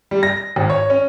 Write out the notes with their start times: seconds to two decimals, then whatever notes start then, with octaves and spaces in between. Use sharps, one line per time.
0.11 G3
0.23 A#6
0.56 G#1
0.70 C#5
0.90 C#4